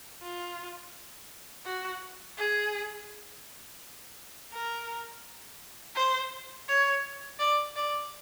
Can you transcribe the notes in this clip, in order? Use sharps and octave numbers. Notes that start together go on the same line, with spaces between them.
F4
F#4
G#4
A#4
C5
C#5
D5
D5